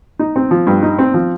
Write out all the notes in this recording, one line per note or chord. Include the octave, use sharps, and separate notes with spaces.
D#4
C4
F3
G2
D#4
C4
F3